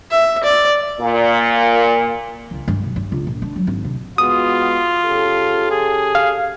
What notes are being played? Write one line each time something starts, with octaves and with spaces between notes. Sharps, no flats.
E5
D5
A#2
C#2
G2
B1
G2
C#2
A#1
D4
F#3
G#1
C2
G#3 B3 F4 F#4 D#6
C#3 G4 A4
G#4
F5